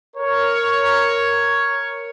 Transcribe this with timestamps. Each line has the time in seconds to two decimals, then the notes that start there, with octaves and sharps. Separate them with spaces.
0.17 A#4 C#5